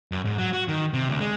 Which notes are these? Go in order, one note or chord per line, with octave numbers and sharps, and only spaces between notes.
F#2
G#2
F#3
F#4
D#3
C3
D2
G#3